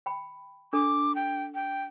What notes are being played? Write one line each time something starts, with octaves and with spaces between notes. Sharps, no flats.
G5 B5
D4 A4 D6
G5
G5